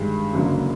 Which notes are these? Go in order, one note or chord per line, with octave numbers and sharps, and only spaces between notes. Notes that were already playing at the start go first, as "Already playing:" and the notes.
Already playing: G2 D#3 G#3
F#1 F#2 D3 F#3 A#3